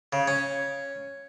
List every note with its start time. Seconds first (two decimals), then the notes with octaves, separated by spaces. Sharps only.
0.13 C#3
0.28 C#4